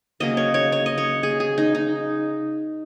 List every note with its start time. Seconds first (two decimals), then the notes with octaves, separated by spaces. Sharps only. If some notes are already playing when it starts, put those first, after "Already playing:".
0.20 C#3 F#3 A#3 D#5
0.37 C#5
0.54 C#5
0.72 C#5
0.86 D#5
0.98 C#5
1.23 G#4
1.40 G#4
1.58 D#4
1.75 D#4